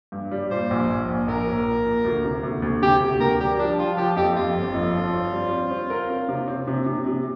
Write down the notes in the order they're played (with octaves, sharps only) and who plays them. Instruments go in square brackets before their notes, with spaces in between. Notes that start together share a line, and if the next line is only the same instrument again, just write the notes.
[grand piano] G2
G3
[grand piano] A#2 [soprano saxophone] C5
[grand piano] A#1
A#1
A#1
[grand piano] A#1 [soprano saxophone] A#4
[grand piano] A#3
A#2
A#2
D2
C3
D2
D2
[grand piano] C3 [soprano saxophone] G4
[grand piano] D2
[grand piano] D2 [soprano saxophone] A#4
[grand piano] G3 [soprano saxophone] G4
[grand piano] F3 [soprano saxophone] D4
[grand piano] F3 [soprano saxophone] F4
[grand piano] F3 [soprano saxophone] G4
[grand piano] F2 [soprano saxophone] G4
[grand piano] F2 [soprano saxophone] F4
[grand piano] G1
F2
F3
C4
G3
C4
C4
A#4
C4
C3
C4
C3
C3
C3